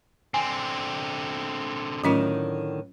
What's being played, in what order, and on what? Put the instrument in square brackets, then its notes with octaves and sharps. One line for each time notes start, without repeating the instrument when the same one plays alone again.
[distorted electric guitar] D3 C4 [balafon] G#5
[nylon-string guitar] A2 D3 D#3 [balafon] F#3 C#4 F4